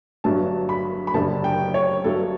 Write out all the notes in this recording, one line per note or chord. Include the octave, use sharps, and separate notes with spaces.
G1 G2 F#3 A5
B5
B5
F#1 F#2 D3 G3 A5
G5
C#5
G1 G2 F#3 A4